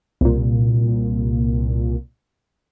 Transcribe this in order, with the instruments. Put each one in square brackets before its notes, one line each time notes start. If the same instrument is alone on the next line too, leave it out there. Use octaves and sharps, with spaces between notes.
[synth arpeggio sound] C2 A#2